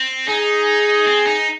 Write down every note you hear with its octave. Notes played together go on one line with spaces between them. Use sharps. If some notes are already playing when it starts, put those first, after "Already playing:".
Already playing: C4
D#4 G#4
C4
D#4